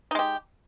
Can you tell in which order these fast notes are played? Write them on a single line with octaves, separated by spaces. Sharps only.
D#4 G#3 G4